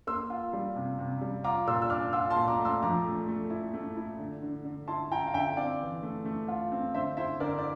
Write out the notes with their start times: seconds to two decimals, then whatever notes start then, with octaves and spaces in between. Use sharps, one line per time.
0.07 A#3 C6 E6
0.30 F4
0.53 G3
0.76 C3
0.99 C3
1.21 G3
1.44 F4 A#5 D6
1.67 A#2 C6 E6
1.82 E6
1.90 D4 D6 F6
2.13 F4 C6 E6
2.30 A5 C6
2.36 A#2
2.48 A#5 D6
2.59 A3
2.65 C6 E6
2.83 F3 A#5 D6
3.04 A3
3.28 A3
3.50 E4
3.74 A3
3.97 E4
4.19 D3
4.42 D3
4.65 D3
4.88 E4 A5 C6
5.11 E4 G5 A#5
5.27 F5
5.34 D3 E5 G5
5.57 C4 D5 F5
5.80 E3
6.03 A3
6.25 A3
6.48 F4
6.72 C4
6.94 D3 C5 E5
7.17 E4 C5 E5
7.40 D3 A#4 D5
7.59 D5